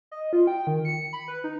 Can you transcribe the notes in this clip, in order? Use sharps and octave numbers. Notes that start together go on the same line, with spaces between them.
D#5
F4
G5
D#3
C#7
B5
B4
D#4